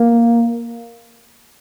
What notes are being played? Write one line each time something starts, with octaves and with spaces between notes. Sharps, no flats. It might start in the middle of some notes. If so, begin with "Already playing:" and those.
Already playing: A#3